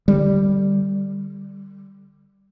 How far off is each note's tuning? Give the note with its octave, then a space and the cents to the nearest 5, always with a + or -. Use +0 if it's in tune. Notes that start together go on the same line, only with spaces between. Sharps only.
D3 +25 G3 -5